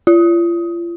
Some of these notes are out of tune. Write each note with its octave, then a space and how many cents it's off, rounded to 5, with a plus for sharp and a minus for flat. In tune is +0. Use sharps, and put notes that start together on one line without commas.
F4 -35